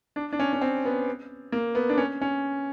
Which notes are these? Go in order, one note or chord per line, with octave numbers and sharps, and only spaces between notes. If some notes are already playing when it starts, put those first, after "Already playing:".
D4
D4
C#4
C#4
C4
B3
A#3
B3
D4
C#4
C#4